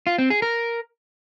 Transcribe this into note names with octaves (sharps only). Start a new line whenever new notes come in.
F4
C4
G#4
A#4